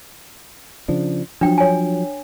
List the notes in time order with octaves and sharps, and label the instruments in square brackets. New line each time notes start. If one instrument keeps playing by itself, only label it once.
[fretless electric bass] C#3 F3 D4
[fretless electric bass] F3 F#3 [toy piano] D4 G5
[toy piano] C#5 G#5